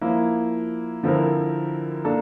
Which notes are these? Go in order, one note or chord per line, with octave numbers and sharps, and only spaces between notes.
F3 A#3 E4
D3 F3 C4 E4 A#4
A#3 D4 A4